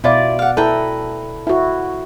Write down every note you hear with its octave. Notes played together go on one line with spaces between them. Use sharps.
B2 E4 F4 D5
F5 F#5
E4 A4 B4 G5 A#5
E4 F#4